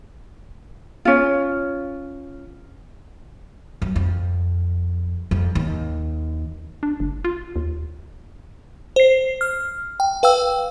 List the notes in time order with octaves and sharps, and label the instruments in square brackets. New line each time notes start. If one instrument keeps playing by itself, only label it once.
[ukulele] C#4 F4
[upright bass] F#2
F2
F2
D#2
[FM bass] D4
F#1
F4
D#2
[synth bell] C5 C7
F6
G5
B4 F5 G5 E6